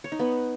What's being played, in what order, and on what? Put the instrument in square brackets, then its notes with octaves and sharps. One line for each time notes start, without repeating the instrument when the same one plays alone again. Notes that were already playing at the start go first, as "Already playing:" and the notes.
[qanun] C#5
D#4
B3